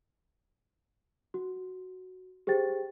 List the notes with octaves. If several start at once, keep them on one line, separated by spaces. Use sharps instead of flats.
F#4
G4 G#4 C5 G5 A6